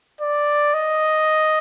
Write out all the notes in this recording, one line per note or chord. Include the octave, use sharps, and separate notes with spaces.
D5
D#5